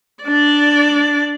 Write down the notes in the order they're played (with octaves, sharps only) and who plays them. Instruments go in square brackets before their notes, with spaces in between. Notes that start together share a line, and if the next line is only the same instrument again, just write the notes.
[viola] D4 D5